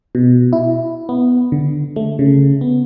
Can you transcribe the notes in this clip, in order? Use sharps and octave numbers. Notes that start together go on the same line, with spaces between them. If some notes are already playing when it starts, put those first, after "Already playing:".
B2
E4
B3
D3
A3
C#3
B3